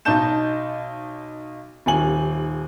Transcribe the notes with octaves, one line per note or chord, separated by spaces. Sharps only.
B1 D#4 D#5 A5 G6 E7
D#1 D#2 G#5 F#7